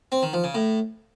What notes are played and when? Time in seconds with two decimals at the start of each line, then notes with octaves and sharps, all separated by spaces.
0.12 C4
0.22 D#3
0.33 F3
0.44 C#3
0.54 A2